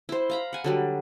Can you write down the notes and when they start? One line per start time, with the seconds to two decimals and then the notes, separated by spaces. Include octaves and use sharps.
0.09 E4 C5
0.30 F5 A#5 B5
0.53 F#5 G#5
0.64 D3 F#3 G3